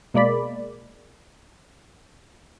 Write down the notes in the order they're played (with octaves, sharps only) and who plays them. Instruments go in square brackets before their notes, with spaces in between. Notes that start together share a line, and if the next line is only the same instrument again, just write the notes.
[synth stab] B2 G#3 A#3 D5 B5